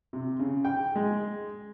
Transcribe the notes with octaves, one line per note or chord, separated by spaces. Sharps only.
C3
C#3
G5
G#3